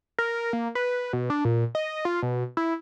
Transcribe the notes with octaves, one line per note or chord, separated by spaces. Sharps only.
A#4
A#3
B4
B2
D4
A#2
D#5
F4
B2
E4